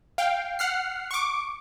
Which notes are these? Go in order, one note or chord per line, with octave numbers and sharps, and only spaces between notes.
F5 G5
F#5 F6 C7
C#6 D6